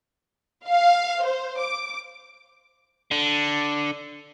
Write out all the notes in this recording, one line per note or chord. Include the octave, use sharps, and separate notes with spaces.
F5
C5
D6
D3